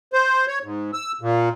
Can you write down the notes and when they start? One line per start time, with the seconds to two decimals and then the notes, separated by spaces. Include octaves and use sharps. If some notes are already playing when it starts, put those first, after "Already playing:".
0.13 C5
0.47 C#5
0.63 G#2
0.93 E6
1.21 A#2